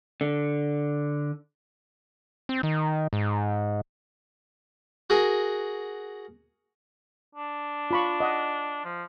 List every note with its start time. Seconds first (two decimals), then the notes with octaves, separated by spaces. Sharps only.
0.21 D3
2.49 C4
2.63 D#3
3.13 G#2
5.10 F#4 G#4 A#4
7.35 D4
7.91 F4 B5 C#6
8.20 D#5 F#5 D#6
8.85 F3